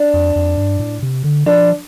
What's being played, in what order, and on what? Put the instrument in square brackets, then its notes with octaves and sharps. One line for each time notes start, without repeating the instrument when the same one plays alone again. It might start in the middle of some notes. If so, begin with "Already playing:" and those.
Already playing: [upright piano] D4
[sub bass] F2
F2
G2
A2
C3
D3
[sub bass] F3 [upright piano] D4